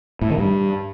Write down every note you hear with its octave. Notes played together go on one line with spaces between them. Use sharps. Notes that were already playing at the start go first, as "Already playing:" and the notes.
A2
D#3
G2